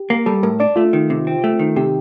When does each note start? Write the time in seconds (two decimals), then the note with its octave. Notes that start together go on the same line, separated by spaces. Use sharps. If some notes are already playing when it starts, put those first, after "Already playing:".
Already playing: G4
0.10 A#3
0.26 G3 A4
0.43 A2 A#4
0.60 D4 D5
0.76 A3 F4
0.93 D#3
1.10 C3
1.27 C4
1.44 A3
1.59 D#3
1.76 C3 G4